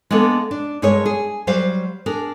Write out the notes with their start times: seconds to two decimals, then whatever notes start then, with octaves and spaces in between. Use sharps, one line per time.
0.11 G#3 A#3 B3 D4 A4
0.51 D4
0.82 G2 G#3 G#4 A#4 C#5
1.06 G#4
1.47 F#3 G3 C5 F5
2.06 D4 G#4 A#4